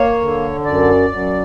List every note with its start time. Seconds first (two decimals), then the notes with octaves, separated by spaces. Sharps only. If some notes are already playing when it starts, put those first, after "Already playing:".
Already playing: A#3 C#5
0.21 D3
0.65 F#2 D5
1.10 F#2